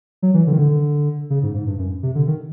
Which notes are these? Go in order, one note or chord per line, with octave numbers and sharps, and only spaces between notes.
F#3
E3
D3
D#3
D3
C#3
G#2
G#2
G2
F#2
C3
D3
D#3